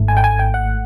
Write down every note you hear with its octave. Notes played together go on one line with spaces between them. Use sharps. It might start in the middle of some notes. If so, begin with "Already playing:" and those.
Already playing: G#1 G#2 A3
G#5
G5
G#5
G5
F#5